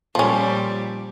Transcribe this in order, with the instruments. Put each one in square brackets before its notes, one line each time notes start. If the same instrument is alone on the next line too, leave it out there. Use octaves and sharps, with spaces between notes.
[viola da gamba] A#2 G3 [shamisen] F3 C#4